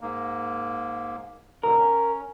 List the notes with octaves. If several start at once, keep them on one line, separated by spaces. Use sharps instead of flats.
G#2 A#3
G#2 B2 D3 A#4
C#4